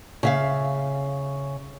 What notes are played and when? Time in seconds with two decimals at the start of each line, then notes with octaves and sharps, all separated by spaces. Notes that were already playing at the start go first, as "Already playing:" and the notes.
0.23 C#3 E5 F5